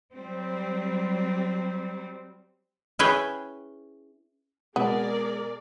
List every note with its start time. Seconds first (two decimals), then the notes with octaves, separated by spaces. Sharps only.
0.14 F#3 G3 C4
2.99 C#4 E4 G#4 B4 C#5 G5
4.76 B2 G#3 B3 G#4 A#4 D5